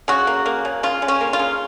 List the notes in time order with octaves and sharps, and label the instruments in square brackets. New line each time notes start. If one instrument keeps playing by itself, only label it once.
[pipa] C#3 F#4
A#3
A#3
C#3
C#3 F4
C#3
C#4
A#3
F4
C#3